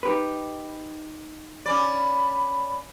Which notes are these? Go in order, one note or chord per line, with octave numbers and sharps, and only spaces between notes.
D#4 G4 B4
C#4 D5 B5